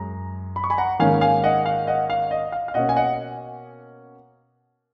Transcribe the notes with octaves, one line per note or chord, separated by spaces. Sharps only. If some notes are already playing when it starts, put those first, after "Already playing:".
Already playing: F#2 G#3 A#5
B5
C#6
G#5 B5
F#5 A#5
G#2 D#3 A#3 C#4 F5 G#5
F5 G#5
D#5 F#5
F5
D#5 F#5
F5
D#5
F5
F5
B2 A#3 C#4 D#5 F#5
G#5
D#5 F#5